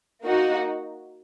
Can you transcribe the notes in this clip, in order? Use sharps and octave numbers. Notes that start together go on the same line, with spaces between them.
A#3 D#4 F#4